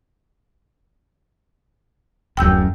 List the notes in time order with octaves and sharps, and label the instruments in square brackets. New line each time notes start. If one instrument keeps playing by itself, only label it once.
[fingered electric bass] D1 F#2 [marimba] G5 E6 G6